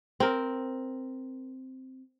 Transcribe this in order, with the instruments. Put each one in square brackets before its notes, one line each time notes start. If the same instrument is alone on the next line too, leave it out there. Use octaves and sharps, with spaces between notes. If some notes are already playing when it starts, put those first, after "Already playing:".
[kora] C4 A#4